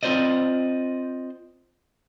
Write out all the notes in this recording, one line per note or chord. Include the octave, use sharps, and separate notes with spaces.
C4 F4 F#4 C5 D5 D#5